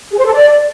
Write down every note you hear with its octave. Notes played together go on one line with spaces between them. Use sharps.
G#4
C5
A4
D5